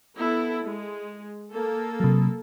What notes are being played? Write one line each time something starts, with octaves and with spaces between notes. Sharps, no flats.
B3 E4 A4
G#3
A#3 A4
C3 F#3